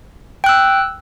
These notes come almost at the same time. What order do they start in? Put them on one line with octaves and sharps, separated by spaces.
G5 F#6 E6